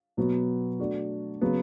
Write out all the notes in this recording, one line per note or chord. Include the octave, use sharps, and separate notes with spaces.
B2 F#3 B3 F#4
A3 D4 F#4
C#3 F#3 B3